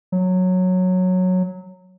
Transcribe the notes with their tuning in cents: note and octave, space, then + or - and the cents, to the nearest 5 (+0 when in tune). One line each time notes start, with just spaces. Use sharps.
F#3 -10